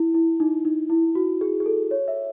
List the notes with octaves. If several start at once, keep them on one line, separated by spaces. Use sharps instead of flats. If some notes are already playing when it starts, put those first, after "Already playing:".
Already playing: E4
E4
D#4
D#4
E4
F#4
G#4
G#4
A4
C#5
E5